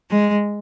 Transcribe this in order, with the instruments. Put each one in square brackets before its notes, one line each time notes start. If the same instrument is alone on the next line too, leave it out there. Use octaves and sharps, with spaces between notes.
[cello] G#3